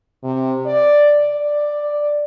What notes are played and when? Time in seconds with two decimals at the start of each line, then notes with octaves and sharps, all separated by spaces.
0.23 C3
0.66 D5
1.33 D5